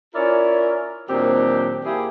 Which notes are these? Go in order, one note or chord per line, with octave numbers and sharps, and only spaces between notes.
C#4 E4 F4 A#4 C#5 D5
A#2 D#3 F#3 C4 D4 G4
A#3 E4 G4 G#4